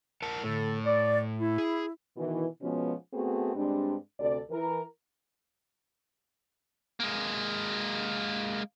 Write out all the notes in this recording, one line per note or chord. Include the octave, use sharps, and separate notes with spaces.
A#4 F#5 A5
A2 D3 A4
D5
E4
G#4
B2 D#3 E3
B2 F3 G#3 B3 C#4
A3 B3 C4 F#4 G#4
G2 G#3 C4 D4
D2 C3 A4 D5
E3 A#4
G#3 A#3